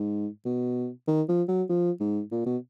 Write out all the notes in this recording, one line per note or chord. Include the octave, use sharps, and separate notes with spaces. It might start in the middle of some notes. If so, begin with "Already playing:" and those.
Already playing: G#2
B2
D#3
F3
F#3
F3
G#2
A#2
B2